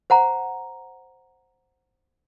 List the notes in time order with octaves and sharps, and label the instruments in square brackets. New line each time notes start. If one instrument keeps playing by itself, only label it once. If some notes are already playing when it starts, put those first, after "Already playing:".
[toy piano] C5 F#5 A#5